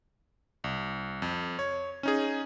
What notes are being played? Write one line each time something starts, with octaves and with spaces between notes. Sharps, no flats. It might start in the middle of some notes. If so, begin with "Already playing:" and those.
C2
F2
C#5
C#4 D#4 G#4